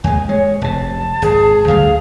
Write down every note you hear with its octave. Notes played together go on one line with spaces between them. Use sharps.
D#2 G#3 G#5
G#3 C#5
F1 C3 A5
G#1 G#4
D2 D3 G3 F5